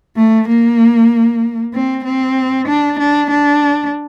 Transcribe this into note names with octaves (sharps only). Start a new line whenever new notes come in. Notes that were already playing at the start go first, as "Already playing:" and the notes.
A3
A#3
C4
C4
D4
D4
D4